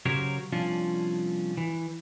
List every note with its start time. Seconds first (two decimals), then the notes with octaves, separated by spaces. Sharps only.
0.06 C#3 F#3 G4 A#4 C5 C#5
0.52 C2 F3 C#4 D4 F4
1.57 E3